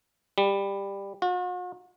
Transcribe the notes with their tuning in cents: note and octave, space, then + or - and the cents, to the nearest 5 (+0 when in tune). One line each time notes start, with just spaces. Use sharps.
G3 +15
F#4 -45